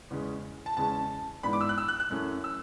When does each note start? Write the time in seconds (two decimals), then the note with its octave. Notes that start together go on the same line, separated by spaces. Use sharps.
0.10 E2 C#3 G#3 C#4
0.66 A5
0.77 E2 C#3 G#3 C#4 A5
1.43 G#2 E3 B3 D4 B5
1.53 D6
1.61 E6
1.69 F#6
1.78 E6
1.88 F#6
2.00 F#6
2.11 F#2 E3 A3 C#4
2.44 E6